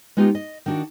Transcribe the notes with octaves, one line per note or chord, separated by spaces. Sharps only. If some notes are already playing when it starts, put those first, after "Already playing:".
G#3 B3 D#4 F4 G4
D#5
D#3 D4 F#4